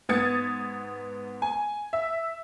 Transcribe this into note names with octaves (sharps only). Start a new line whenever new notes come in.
G#2 B3 D#6 G#6 A6 C#7
G#5
E5